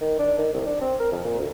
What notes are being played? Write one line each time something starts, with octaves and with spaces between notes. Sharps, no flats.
D#3
D4
D#3
C2
D4
C4
A#4
F2
A#2
D2